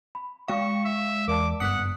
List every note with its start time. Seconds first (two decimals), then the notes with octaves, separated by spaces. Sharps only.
0.15 B5
0.48 G#3 F5 C#6
0.85 E5
1.28 E2 A#4 D5 A5 D6
1.60 F#1 G2 B3 F#5 D#6 F#6 B6 C#7